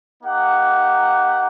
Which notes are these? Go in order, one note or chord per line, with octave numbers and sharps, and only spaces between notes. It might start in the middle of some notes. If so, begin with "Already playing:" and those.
A#3 D#4 G4 F#5